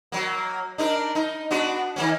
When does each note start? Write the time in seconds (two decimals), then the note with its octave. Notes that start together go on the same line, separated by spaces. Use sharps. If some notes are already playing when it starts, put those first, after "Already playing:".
0.12 F#3 A#3
0.78 D4 D#4 A#4
1.15 D#4
1.51 B3 D4 F#4
1.96 D#3 A#3 C#4